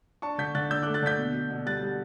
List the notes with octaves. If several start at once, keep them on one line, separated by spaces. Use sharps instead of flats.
D4 A5 C#6
D3 G6 B6
D3 F#6 A6
D3 E6 G6
A3 D6 F#6
F#6 A6
D3 G6 B6
B2
B2
B2
G3 F#6 A6
G3